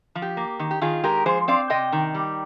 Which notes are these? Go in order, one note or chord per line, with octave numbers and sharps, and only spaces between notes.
F3
G4
A#3
D#3
G4
D#3 F4 G#4
G#3 G4 A#4
F3 G#4 C5
C4 D5 F5
C3 D#5 G5
D#3
G3